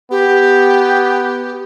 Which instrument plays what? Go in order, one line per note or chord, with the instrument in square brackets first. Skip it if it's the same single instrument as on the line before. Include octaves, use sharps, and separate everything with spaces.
[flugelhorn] B3 [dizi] G4